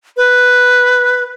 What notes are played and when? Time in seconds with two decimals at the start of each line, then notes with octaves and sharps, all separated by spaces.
0.17 B4